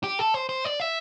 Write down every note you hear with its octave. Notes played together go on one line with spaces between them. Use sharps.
G4
A4
C5
C5
D5
E5